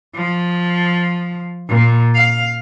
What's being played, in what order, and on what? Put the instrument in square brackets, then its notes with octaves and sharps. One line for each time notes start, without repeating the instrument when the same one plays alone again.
[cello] F3
A#2
F5